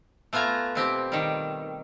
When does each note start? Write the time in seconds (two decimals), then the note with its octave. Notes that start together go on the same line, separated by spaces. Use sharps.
0.33 A3 B3 F4 G#5 A#5
0.75 B2 C4 G4
1.12 D#3 G3